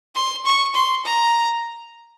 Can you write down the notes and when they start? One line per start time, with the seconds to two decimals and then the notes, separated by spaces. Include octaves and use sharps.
0.15 C6
0.45 C#6
0.74 C6
1.05 A#5